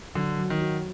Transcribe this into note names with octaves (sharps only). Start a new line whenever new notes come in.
D3 F#3
F#3
D#3
F#4